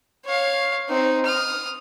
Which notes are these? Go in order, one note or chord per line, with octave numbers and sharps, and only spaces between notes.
C#5 F5
C4 D#4
D#6 F6